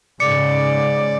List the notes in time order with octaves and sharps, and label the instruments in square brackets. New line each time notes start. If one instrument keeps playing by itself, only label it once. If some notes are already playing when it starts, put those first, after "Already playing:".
[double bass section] G#2 C#3 [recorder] D5 [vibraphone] D6 [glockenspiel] C#7